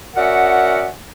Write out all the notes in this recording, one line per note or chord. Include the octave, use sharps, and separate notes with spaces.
C#4 F#4 A#4 D5 E5 F#5